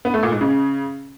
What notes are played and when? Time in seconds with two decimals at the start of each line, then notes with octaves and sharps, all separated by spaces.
0.05 B3
0.14 A3
0.23 A#2
0.32 G#2
0.41 C#3